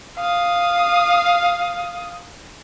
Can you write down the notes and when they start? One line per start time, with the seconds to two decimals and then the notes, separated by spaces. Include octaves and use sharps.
0.17 F5 D#6